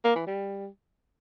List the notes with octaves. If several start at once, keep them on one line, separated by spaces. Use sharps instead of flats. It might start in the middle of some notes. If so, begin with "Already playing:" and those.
A#3
E3
G3